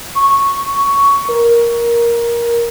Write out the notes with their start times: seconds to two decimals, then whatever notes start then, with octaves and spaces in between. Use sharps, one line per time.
0.15 C#6
1.29 A#4